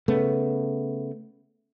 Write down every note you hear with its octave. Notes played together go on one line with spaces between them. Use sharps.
C#3 A3 B3